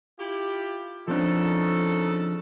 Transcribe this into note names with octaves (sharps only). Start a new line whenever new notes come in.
E4 F4 G4
C#3 F3 C4 D4 D#4 A4